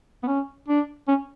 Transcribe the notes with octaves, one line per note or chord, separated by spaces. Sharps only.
B3
C#4
D4
C#4